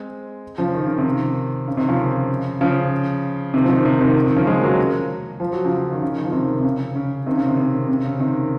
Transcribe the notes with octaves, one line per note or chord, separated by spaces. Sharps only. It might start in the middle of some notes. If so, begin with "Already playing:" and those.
Already playing: G#3 C4
C#3 F3
D#3
C#3
C3 D#3
C#3
C3 D#3
C#3 F3
C#3 F3
C3 D#3
F3
C3 D#3
C3 D#3
C3 D#3
C3 D#3
C#3 F3
F3 G#3
F#3 A#3
F3
F#3
C#3 F3
D#3
C#3
D#3
F3
C3 D#3
C3
C#3
C#3
C3 D#3
C#3
C3 D#3
C3
C3
C#3
C3 D#3